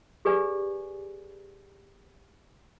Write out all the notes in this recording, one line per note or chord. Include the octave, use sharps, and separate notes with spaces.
G4 G#4 B4 D5 G#5